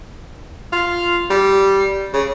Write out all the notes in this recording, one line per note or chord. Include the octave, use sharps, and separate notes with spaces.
F4
G3
C#3